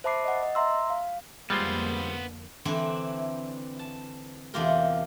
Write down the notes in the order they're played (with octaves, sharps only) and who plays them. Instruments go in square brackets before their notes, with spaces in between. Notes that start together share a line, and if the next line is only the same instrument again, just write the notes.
[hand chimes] C5 E5 A5 B5 D6 C7
D#5 F#5
D#5
E5 A#5 C6 E6
F5
[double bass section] F2 D3 A#3 [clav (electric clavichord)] G3 G#3 F4 [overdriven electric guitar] B3 C5
[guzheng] D3 E3 C4 D4 E4
A5
E2 C3 D4 F4 G4 A#4